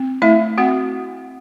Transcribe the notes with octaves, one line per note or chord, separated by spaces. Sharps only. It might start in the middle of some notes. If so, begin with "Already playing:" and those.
Already playing: C4
A3 E4 E5
C4 F#4 F#5